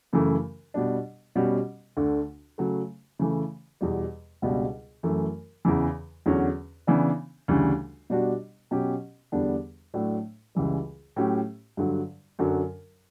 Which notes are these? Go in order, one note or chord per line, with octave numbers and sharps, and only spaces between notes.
F#2 C#3 E3 A3
B2 G3 D4
B2 G3 C#4 F#4
D2 D3 A3
C#3 F#3 A3
C#3 E3 A3
E2 B2 G3
C#2 B2 G3 D4
F#2 E3 A3
E2 C#3 E3
E2 D3 F#3 C#4 F#4
C#3 E3 B3 D4
D2 C#3 E3 G3
B2 G3 D4 F#4
B2 F#3 C#4 G4
E2 D3 G3 B3 D4
A2 F#3 A3 D4
C#2 C#3 E3 G3
A2 F#3 C#4 G4
G2 D3 F#3
F#2 D3 F#3